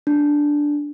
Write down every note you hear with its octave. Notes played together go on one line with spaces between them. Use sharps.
D4